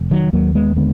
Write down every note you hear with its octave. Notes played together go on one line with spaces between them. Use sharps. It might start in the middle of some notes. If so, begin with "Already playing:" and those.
Already playing: F1
D#3 F#3
D#2 F#3 A#3
G#3 B3
D3 G#3 B3